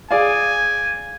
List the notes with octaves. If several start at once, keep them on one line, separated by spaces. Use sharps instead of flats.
G#4 D5 F5 G#5